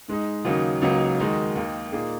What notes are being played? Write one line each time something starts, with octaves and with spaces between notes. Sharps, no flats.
G#2 G#3 D#4
D#2 C#3 F#3 A#3 D#4
C#2 C#3 F#3 A#3 D#4
D#2 D#3 G#3 D#4 F#4
D#2 D#3 A#3 D#4
A#2 A#3 D#4 G#4